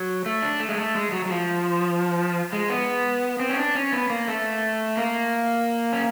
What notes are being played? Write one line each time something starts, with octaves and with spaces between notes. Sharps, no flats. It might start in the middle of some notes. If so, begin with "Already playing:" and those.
Already playing: F#3
A3
D4
A3
G#3
A3
G#3
F#3
F#3
F3
G#3
B3
C4
C#4
D4
C#4
B3
A#3
A3
A#3
C#4